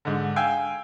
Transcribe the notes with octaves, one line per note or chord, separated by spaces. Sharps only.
G#2 D3
F5 G5 G#5 E6 G6